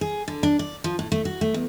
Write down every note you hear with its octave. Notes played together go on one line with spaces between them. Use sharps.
G#4
D3
D4
D5
F3
A2
A3
F#4
A3
E2